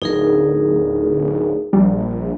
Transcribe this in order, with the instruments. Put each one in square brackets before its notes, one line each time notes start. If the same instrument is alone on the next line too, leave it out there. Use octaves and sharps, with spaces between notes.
[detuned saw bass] D1 [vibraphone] D#4 G#4 A#4
[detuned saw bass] A#1 [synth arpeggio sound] G3